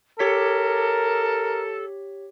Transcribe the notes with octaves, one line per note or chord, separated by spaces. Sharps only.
G4 A4 A#4 C#5 B6